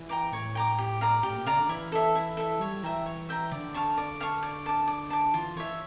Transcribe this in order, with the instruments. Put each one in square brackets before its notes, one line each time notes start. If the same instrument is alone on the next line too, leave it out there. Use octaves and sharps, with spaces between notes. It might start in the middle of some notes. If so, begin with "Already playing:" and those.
Already playing: [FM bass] E3
[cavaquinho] G5 A#5 D6
[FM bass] A2 [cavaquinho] C#5
[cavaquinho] G5 A#5 D6
G4
D5 F5 A#5
[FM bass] A2 [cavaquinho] G4
[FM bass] A#2
[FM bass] C#3 [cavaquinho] D5 F5 A#5
[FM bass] D3
[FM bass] E3 [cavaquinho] E4
[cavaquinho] A4 E5
E4
A4 E5
[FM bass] G3 [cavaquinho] C#5
[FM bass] E3 [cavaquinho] E5 G5 A#5
[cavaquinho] C#5
E5 G5 A#5
[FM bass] D3 [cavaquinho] D5
[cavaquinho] F5 A5 C#6
D5
F5 A5 C#6
D5
A5 D6
D5
A5 D6
[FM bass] E3 [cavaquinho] F4
[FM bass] E3 [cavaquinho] C#5 E5